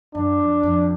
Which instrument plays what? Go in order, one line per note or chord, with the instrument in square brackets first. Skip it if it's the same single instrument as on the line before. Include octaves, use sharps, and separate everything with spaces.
[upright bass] F#2 [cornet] D4
[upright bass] F2
F2